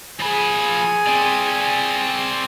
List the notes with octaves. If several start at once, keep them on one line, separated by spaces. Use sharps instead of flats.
F3 G#4 G#5 B5
C4 D5